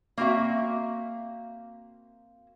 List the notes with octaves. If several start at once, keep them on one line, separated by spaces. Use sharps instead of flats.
A#3 C4 D#4 F#4 E5